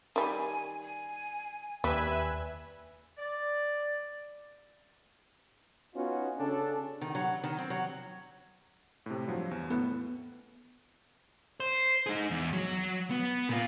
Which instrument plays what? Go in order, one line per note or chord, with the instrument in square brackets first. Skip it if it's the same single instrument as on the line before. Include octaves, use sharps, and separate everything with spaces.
[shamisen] D#3 G3 [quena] G#5
[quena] G#5
[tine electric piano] D#2 [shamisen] G3 [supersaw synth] B4 E5 G#5
[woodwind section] D5
[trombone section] B3 C#4 D#4 F4 F#4
C#3 C#4 D4 A4
[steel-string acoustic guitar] D#3
F#3
D#3
C4
F#3
[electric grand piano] A2 C3
G2 F3 F#3
E2
[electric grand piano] A2 A4 [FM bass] B3
[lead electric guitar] C5
D#4 G#4
E2
F#3
B3
A#2 F4